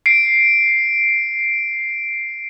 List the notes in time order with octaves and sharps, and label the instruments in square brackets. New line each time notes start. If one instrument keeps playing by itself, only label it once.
[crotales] C7 D7